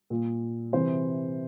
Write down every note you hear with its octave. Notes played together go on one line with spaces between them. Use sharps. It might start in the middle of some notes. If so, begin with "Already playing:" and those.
A#2
C3 E3 C5